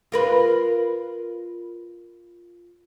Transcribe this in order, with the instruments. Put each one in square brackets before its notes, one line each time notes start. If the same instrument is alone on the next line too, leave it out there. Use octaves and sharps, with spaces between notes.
[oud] F4 A#4 B4